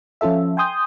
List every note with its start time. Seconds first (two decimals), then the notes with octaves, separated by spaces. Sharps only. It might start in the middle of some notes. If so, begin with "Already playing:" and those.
0.21 F3 C#4 F4 A4 E5
0.57 G5 G#5 C6 D#6 G6